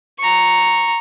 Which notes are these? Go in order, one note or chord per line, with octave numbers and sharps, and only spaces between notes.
A#5 C#6